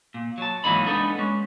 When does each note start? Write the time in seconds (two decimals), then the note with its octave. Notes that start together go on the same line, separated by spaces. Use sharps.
0.14 A#2
0.38 F#3 A5
0.64 G#2 E3 F#3 A#3 D#4 B5
0.87 G#3 A3 B3 D4 D#4 A4
1.19 G#3 C#4